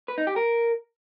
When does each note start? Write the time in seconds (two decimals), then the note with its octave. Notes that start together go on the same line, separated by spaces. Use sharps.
0.08 B4
0.18 D#4
0.27 G4
0.36 A#4